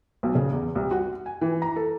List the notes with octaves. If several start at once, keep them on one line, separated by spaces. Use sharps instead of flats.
B1
C#3
E2
C2
F#4
G#5
E3
A#5
A4